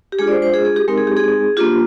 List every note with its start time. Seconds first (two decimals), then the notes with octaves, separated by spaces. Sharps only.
0.12 G4
0.19 G#3 D4 F4 G#4
0.27 D5
0.31 C5
0.42 C5
0.54 G#4
0.65 G#4
0.76 G4
0.88 G#3 C4 D#4 A#4
0.98 G#4
1.07 G4
1.17 G#4
1.57 A#3 D4 F4 G4